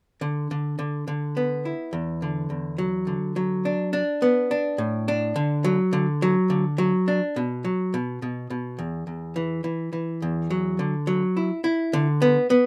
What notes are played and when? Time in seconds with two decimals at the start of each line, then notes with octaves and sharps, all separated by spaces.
0.21 D3
0.51 D3
0.79 D3
1.08 D3
1.37 B3
1.65 E4
1.93 E2
2.22 D3
2.50 E2
2.78 F#3
3.07 D3
3.36 F#3
3.65 D4
3.93 D4
4.22 B3
4.51 D4
4.78 A2
5.08 D4
5.36 D3
5.64 F#3
5.93 D3
6.22 F#3
6.50 D3
6.78 F#3
7.08 D4
7.36 B2
7.64 F#3
7.94 B2
8.22 B2
8.50 B2
8.79 E2
9.07 E2
9.36 E3
9.64 E3
9.93 E3
10.22 E2
10.50 F#3
10.79 D3
11.07 F#3
11.37 E4
11.64 E4
11.93 D3
12.22 B3
12.50 B3